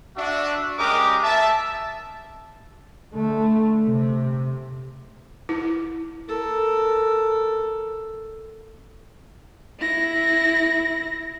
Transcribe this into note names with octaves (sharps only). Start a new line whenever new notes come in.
D4 F#4 E5
G#3 C#4 G4 A#4 D6 D#6
E5 A5
D3 A3
C3
E4
A4 A#4
E4 A#6